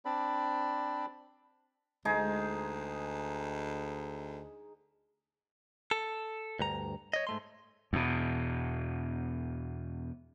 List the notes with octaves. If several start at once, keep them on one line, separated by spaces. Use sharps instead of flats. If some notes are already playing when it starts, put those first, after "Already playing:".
C4 D4 D5 B5
D2 G#3 D#4 G#4
A4
D2 G2 A#5
C#5 D#5
G#2 A3 C6
E2 B2